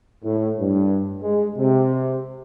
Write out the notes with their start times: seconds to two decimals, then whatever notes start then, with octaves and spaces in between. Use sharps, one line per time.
0.23 A2
0.59 G2
1.23 G#3
1.56 C3